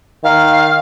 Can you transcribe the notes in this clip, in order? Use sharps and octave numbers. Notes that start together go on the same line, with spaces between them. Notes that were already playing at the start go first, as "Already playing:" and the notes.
D#3 F5